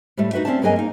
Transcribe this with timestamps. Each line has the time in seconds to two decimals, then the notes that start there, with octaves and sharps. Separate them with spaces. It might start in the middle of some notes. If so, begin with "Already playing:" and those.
0.17 A2 G3 A3
0.33 D#4 F#4 B4 E5
0.45 C4 C#4 F#4 D5 E5 A5
0.62 G2 F#3 A#3 G#4 D#5 G#5
0.76 A#3 D#4